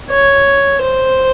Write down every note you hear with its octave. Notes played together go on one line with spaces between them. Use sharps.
C#5
C5